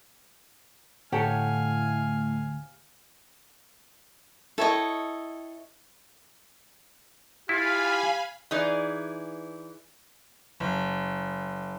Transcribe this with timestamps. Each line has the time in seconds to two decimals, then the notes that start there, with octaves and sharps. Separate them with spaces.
1.12 D2 A2 G4 A4 C#5 F5 F#5 G#5
4.58 E4 A4 C#5 D#5 G5
7.49 E4 F4 G4 F5 G#5 B5
8.51 E3 D#4 G#4 D5
10.60 F#1